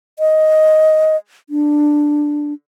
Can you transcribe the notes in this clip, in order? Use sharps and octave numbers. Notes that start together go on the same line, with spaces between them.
D#5
D4